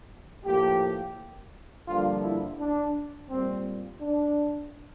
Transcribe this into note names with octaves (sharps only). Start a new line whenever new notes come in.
A2 F3 A#3 G4
G2 D3 F3 A#3 F4
E4
D4
A#2 G3 A#3 C4
D4